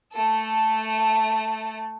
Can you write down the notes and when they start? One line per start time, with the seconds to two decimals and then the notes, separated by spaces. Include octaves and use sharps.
0.14 A3 A4